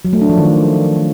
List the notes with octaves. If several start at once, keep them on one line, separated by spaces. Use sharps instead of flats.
F#3
A3
D4
F3
D#3